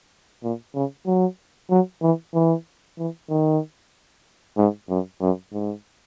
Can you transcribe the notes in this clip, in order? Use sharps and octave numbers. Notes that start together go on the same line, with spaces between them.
A#2
C#3
F#3
F#3
E3
E3
E3
D#3
G#2
F#2
F#2
G#2